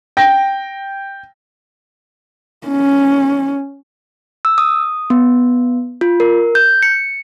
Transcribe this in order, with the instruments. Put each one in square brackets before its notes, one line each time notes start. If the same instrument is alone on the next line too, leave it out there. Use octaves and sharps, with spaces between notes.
[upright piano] G5 A#6
[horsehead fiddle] C#4
[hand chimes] E6
D#6
B3
F4
A#4
G6
C#7